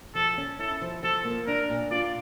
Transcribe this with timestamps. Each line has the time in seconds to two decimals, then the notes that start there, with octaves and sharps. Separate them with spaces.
0.15 F3 A4
0.38 C#4
0.59 E4 A4
0.81 F3
1.03 F3 A4
1.24 A#3
1.47 D4 A#4
1.69 A#2
1.91 F4 D5